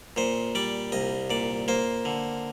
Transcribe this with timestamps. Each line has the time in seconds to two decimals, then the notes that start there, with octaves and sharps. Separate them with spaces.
0.16 A#2 C5
0.55 G3 D5
0.92 C2 D#5
1.30 A#2 D5
1.68 A#3 C5
2.05 D3